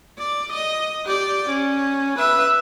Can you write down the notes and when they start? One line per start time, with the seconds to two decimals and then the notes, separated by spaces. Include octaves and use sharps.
0.19 D5
0.53 D#5
1.05 G4 D5
1.49 C#4
2.19 B4 E5